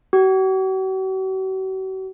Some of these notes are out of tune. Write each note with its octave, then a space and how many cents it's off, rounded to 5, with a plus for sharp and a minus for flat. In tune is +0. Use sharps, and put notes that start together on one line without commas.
F#4 +45